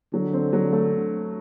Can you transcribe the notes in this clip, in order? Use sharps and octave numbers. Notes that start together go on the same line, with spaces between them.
D3 F#3
C4
F#3
A3